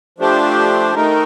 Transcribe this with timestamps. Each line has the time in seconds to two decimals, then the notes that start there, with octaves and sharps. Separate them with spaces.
0.18 F3 A3 D4 G4 C5
0.95 D#3 A3 D#4 A#4